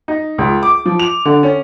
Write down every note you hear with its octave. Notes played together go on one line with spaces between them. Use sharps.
D#4
C#2
D6
F3
F7
D3
C#4